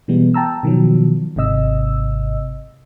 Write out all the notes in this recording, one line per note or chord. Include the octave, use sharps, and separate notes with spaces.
B2 E3 G3 G#3 B3
G5 A5 A#5 E6
B2 D#3 F3 F#3
G#1 G#2 C3 D#5 E6